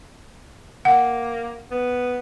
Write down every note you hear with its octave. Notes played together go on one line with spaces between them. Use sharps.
A#3 F#5
B3